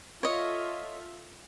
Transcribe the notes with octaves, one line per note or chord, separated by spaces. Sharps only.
F4 A4 C#5 D#5 E5